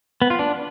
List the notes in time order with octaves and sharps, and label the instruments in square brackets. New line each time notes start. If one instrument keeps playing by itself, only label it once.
[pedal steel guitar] B3
F4
D4